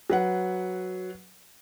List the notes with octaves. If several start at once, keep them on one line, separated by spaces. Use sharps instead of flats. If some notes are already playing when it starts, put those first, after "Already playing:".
F#3 B4 F#5